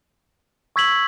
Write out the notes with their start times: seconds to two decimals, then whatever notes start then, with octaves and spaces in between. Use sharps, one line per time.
0.76 C#6 E6 G#6 B6 F#7